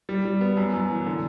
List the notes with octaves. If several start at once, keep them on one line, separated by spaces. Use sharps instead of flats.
G3
G3
B3
F#2
F#2
E3
D3